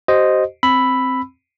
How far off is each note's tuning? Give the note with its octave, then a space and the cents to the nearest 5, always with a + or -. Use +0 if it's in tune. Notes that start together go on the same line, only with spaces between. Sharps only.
G4 -45 C5 +0 D#5 +0
C4 +0 B5 +5 E6 +0